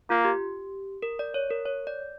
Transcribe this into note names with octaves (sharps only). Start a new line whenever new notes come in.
A#3 F4
G4
A#4
D5
C#5
A#4
C#5
D5